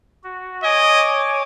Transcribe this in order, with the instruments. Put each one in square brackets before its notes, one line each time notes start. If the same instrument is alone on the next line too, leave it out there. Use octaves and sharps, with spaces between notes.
[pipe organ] F#4
[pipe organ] C#5 G#5 D6 [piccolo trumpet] D#5